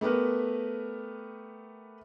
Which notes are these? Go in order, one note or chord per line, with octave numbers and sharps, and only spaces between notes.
A3 B3 G4 A#4 B4